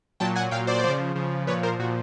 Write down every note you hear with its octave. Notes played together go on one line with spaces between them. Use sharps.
A#2 F#3 G5 A5
F#5 G#5
A#2 F#3 F5 G5
C5 D5
C#3 F3
C#3 F3
A#2 F3 B4 C#5
A#4 C5
A#2 F3 F#4